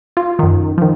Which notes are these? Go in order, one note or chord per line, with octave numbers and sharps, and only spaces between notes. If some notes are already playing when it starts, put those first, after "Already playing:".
F4
F#2 D#3
D#3 F3